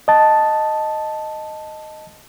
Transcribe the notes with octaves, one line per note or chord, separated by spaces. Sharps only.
D#5 A5